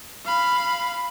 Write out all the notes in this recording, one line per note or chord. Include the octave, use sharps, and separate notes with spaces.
F5 B5